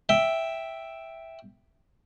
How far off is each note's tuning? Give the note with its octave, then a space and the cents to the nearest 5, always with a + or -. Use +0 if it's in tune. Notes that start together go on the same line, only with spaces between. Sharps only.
E5 +0 G5 +0